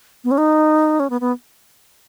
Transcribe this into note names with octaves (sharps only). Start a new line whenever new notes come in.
B3
C#4
D#4
C#4
B3
B3